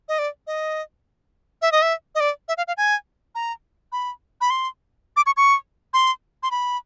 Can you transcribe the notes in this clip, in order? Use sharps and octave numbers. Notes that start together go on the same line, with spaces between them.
D#5
D5
D#5
E5
D#5
E5
D#5
D5
E5
F5
F5
G#5
A#5
B5
B5
C6
D6
C#6
C#6
C6
C6
B5